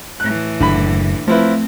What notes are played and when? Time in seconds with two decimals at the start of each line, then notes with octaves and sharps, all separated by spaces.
0.20 A2 E3 F#6
0.60 F#1 D3 B5
1.28 F3 A3 C4 E4 B4